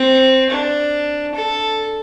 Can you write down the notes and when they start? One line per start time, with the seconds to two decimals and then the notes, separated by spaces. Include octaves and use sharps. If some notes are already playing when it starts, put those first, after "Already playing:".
Already playing: C4
0.50 D4
1.35 A4